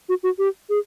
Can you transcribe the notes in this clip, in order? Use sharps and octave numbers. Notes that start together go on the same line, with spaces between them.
F#4
F#4
G4
G#4